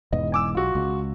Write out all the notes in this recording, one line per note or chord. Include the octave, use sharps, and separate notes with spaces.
E1 E2 G#2 D#5
G#5 D6 E6
B1 F4 F#4
C#2